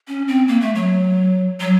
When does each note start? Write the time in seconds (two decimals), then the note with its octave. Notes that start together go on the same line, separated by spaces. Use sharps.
0.08 C#4
0.28 C4
0.48 A#3
0.61 A3
0.75 F#3
1.60 F#3